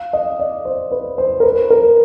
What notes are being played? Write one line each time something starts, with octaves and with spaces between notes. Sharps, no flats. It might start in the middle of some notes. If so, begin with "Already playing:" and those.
Already playing: F5
D#5
D5
C5
B4
C5
A#4
B4
A#4